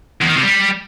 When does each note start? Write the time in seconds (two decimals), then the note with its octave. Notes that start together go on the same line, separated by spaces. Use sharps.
0.22 E2
0.29 D#3
0.36 C3
0.43 G3